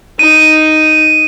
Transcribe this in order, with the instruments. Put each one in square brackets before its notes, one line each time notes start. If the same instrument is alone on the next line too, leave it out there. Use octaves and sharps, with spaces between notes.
[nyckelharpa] D#4 [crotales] D#7